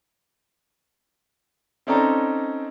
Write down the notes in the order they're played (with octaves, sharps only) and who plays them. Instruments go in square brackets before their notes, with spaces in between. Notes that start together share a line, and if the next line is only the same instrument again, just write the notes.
[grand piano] C4 C#4 D#4 A4 D5 A#5